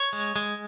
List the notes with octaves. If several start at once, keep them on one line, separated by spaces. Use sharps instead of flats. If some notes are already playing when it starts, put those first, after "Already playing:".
Already playing: C#5
G#3
G#3